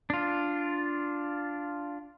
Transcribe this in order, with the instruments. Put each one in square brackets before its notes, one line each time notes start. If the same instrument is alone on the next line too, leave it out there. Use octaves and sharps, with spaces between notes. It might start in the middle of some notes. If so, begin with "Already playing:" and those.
[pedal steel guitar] D4 F4